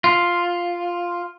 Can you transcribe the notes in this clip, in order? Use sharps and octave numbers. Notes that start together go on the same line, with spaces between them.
F4